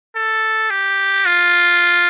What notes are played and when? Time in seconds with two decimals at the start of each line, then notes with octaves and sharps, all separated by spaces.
0.16 A4
0.70 G4
1.26 F4